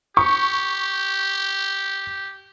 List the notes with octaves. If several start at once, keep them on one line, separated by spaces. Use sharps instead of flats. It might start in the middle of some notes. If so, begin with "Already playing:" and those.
G4 C#6